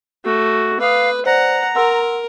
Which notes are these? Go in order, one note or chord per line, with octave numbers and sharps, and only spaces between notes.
A3 F#4
B4 F5 D6 D#6
C5 D5 F#5 A#5
A#4 F#5 C6 E6